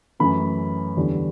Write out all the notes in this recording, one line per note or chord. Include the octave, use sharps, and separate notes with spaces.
F#2 E3 A3 B5
E2 D3 G3 D4